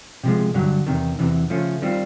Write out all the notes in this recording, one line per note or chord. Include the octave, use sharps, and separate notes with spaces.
C3 F3 G#3
G2 D3 F#3
E2 C3 D#3
E2 C3 E3
C#3 F3 A3 C#4
D#3 G3 C4 F4